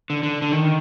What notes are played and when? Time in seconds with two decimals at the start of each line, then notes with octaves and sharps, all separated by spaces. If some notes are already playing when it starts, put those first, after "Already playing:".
0.10 D3
0.23 D3
0.42 D3
0.52 D#3